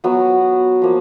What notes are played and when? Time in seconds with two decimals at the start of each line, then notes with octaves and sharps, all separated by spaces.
0.04 F#3 B3 F#4
0.82 F3 A#3